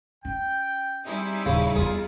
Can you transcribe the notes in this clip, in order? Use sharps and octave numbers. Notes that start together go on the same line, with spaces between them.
C#4 G5
G3 C4 D#4 E4 G#4
D#1 C#3
E2 C4 F4 G#4